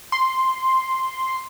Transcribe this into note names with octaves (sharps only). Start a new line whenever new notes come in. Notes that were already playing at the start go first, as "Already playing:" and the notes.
C6